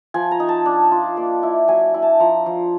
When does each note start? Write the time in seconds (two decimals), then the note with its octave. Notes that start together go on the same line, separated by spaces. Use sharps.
0.14 F3 G#5
0.31 A#5
0.40 D#4
0.49 A5
0.66 D4
0.92 F4
1.17 A#3
1.43 E4
1.68 F#3 G#5
1.94 E4
2.02 A5
2.20 F3 A#5
2.46 F3